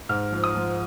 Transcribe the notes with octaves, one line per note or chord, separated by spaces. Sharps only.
G#2 F6
F3
D#6
F3